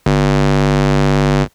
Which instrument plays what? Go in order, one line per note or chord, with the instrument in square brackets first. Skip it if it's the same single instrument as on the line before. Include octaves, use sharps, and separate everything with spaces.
[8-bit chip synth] G1